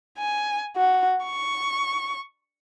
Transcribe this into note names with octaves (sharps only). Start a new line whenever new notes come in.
G#5
F#4
C#6